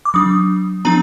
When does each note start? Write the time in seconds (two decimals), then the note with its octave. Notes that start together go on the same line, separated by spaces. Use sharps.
0.05 D6
0.14 F#3 D4 D#6
0.85 F3 B3 D4 A#5